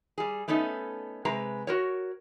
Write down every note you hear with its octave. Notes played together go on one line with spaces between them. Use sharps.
G3 G#4
A3 B3 C#4 D#4 A4
C3 G#3 B4 A#5
F#4 A#4 C#5